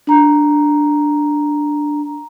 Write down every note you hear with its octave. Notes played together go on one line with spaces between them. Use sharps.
D4 A#5